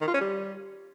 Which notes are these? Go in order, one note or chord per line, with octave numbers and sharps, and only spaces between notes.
D#3
F4
C#4
G3